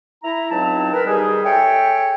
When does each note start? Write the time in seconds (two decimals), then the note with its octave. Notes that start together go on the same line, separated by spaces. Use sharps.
0.23 E4 A#5
0.51 C#2 F#3 C4 D#4 A5
0.93 A#4 B4
1.06 D#3 G3 D#4 G4 G#4
1.44 G#4 A4 C#5 E5 G5